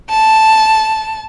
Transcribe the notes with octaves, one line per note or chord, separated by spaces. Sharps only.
A5